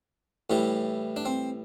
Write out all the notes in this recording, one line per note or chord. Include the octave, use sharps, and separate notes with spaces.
A2 E3 G3
D4
C4